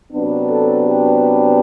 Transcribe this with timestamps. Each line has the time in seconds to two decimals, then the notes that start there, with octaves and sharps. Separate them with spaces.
0.12 C3 F#3 B3 D4
0.48 A4
0.84 G4